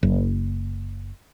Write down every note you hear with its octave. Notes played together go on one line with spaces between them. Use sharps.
F#1